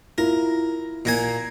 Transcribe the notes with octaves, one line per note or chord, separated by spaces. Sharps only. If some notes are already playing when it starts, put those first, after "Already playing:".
E4 F4 A#4
A#2 A#3 G#5